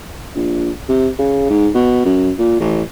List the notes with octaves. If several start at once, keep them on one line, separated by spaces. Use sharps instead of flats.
A#1
C3
C#3
G#2
B2
F#2
A#2
A1